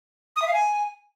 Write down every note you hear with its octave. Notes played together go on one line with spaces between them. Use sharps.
D#6
E5
F5
G#5